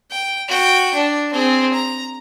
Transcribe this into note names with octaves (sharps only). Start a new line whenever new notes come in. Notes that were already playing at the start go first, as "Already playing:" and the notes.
G5
F#4 G5
D4
C4 G#4
A#5